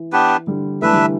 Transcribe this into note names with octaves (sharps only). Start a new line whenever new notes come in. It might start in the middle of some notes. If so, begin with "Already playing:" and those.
Already playing: E3
B3 D4 G4 B4
D3 G3
E3 A3 D4 B4 E5
D3 G3